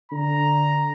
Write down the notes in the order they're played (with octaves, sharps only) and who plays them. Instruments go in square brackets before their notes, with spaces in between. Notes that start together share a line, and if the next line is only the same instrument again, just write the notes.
[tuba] D3 [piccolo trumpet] A#5